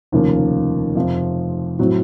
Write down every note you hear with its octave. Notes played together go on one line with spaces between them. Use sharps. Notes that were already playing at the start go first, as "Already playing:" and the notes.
F1 D#2 C#3 F3 A#3
F2 C3 F3 C4
A2 F#3 C4 F#4